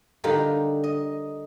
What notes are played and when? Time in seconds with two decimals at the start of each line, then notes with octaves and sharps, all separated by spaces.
0.24 D3 G3 D#4 F4 G4 A#4
0.84 D#5